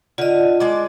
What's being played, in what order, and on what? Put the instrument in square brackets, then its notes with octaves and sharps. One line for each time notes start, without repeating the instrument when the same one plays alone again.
[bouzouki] D3 [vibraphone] F4 D#5
[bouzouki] G#3 D5 [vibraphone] D#5